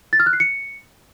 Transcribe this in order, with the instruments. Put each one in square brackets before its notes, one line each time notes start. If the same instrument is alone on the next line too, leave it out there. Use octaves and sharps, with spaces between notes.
[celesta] A6
F6
F#6
C7
C#7